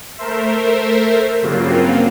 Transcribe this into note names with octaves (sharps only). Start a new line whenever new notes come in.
A3 A#4 C5 E5
G2 C#3 F#3 A#3 C4 F4